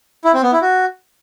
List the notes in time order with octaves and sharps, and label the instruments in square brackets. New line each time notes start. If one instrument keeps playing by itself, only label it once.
[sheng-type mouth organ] E4
C4
B3
E4
F#4